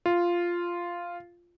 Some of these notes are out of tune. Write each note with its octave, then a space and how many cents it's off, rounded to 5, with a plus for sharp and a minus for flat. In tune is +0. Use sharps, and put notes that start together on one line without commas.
F4 -5